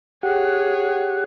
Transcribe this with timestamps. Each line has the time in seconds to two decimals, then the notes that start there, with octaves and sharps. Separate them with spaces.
0.23 G4 G#4 C#5 F#5